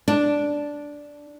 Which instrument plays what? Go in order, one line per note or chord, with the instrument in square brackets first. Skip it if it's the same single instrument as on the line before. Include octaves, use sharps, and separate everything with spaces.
[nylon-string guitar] D4